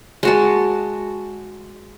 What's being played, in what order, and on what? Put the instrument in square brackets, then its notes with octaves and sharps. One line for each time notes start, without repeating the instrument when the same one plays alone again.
[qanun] G#3 F#4 A5